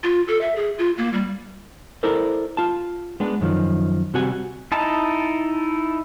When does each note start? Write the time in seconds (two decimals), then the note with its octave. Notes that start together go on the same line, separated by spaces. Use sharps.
0.04 F4
0.28 A4
0.41 E5
0.56 G#4
0.78 F4
0.98 A#3
1.13 G3
2.03 E4 A4 A#4 C5 D5
2.57 F4 A5
3.20 G#3 B3 D4
3.41 F#2 D#3 F3
4.14 C3 G3 F#4 G#5
4.72 D#4 E4 A5